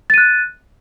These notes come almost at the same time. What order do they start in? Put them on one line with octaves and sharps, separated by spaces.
A6 D#7 F#6